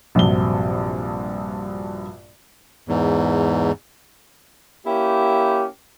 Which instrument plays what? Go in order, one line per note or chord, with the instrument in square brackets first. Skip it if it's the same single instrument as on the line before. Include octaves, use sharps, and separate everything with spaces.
[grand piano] A#1 G2 C3 F#3 G7
[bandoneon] E2 G#2
[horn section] A#3 C#4 E4 G4